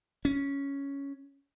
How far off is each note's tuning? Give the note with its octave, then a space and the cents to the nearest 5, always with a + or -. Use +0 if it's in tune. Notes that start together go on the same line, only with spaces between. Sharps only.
C#4 +5